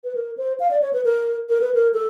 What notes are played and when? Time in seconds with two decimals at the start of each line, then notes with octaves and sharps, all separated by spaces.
0.04 B4
0.15 A#4
0.37 C5
0.60 F5
0.71 D5
0.82 C#5
0.93 B4
1.05 A#4
1.49 A#4
1.61 B4
1.74 A#4
1.94 A4